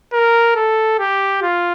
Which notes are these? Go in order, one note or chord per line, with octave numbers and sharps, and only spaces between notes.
A#4
A4
G4
F4